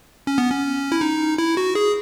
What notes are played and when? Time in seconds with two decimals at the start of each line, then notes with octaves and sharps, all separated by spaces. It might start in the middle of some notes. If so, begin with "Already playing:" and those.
0.27 C#4
0.38 B3
0.50 C#4
0.92 E4
1.01 D#4
1.38 E4
1.57 F#4
1.75 G#4